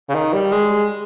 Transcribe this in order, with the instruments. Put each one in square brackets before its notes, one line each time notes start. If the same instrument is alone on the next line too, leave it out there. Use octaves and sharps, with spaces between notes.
[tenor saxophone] C#3
D#3
G3
G#3